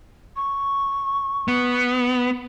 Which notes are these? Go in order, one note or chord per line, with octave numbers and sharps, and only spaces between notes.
C#6
B3